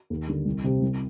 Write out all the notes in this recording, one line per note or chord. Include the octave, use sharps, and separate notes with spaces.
D#2
D3 G3
C2
C3 G3 C4
C2